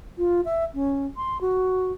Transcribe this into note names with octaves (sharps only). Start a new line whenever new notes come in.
F4
E5
C#4
C6
F#4